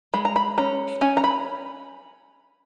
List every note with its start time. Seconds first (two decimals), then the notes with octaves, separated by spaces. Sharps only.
0.14 G#3 B5
0.25 A#5
0.36 B5
0.58 C#4 A#5
1.01 C#4 G#5
1.17 A#5
1.24 B5